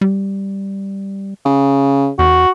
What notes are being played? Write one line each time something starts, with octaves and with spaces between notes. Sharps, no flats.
G3
C#3
E2 F#4